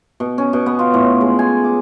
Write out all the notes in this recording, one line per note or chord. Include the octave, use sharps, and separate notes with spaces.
B2
C#4
B2
B3
F4
A2
G#3
G#5
D6